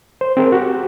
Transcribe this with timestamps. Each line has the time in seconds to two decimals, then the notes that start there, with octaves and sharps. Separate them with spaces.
0.21 C5
0.37 C4 G#4 A#4
0.52 F#4 G4